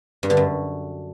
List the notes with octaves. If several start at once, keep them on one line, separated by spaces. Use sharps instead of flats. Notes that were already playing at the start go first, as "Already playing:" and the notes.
G2
D3
F#2